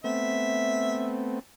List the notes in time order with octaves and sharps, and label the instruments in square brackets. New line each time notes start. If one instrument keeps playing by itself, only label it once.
[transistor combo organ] A3 B3 C4 [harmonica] E5